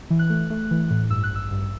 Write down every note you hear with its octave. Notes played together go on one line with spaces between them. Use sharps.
E3
F#6
A3
A3
E3
A2
G2 E6
F#6
A1 E6
G2